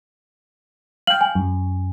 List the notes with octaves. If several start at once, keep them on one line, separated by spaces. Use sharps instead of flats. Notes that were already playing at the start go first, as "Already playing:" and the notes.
F5 G5 F#7
G#5
F#2